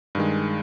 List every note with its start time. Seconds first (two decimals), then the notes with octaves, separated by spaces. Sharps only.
0.15 G2 D#3 G#3